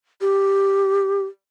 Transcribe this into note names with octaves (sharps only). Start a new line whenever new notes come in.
G4